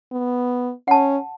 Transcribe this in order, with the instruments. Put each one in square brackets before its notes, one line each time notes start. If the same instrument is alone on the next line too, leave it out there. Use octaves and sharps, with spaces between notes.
[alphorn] B3
[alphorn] C#4 [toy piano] F#5 A5